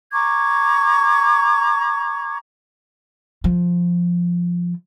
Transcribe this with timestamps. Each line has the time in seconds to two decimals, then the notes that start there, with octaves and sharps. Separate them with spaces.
0.13 A#5 C#6 D6 G#6
3.44 F3